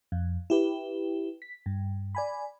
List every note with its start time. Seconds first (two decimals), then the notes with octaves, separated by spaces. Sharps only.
0.12 F2
0.50 E4 G4 B4
1.42 B6
1.66 G2
2.15 D5 G#5 B5